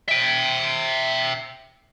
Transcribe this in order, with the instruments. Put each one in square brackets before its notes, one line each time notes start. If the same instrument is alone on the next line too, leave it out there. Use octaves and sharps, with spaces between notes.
[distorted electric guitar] E5 G5